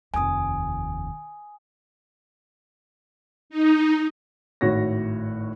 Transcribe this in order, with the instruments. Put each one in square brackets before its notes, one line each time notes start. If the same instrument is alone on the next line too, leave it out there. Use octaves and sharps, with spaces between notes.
[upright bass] F1 D#2 [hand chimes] G#5 D#6
[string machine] D#4
[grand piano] G#1 A2 F#4 C#5 A#6